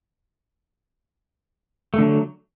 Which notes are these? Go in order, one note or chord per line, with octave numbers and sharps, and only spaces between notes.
D3 F#3 A3